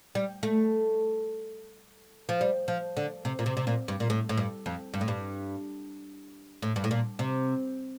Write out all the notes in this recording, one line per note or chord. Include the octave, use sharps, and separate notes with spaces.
G3
A3
F3
G3
F3
D3
C3
A#2
C3
C3
A#2
G2
A#2
A2
A2
G2
F2
G2
A2
G2
A2
G2
A2
A#2
C3